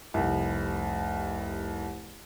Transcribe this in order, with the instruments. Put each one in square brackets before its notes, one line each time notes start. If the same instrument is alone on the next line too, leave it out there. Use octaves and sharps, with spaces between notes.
[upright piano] F1 C2